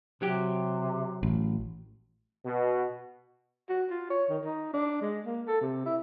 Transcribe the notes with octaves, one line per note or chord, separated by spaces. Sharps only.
C3 F#3 G4
A1
B2
F#4
F4
C#5
D#3
D#4
D4
G#3
A#3
A4
C3
E4